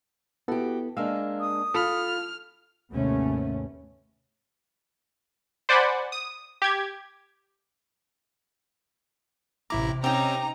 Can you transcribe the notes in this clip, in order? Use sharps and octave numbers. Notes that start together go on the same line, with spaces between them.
B3 E4 F#4 G4 A4
G#3 A#3 D4 F5 E6
D#6
F4 A4 B5 F6
G#1 D#2 C3 A3 B3 C#4
C5 D5 F#5 G#5 B5
D#6
G4 G#6
A1 C3 E4 A#5 D6
C4 C#4 D#4 G4 G5 A#5